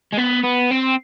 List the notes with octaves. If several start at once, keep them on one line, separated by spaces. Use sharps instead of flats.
G#3
B3
B3
C4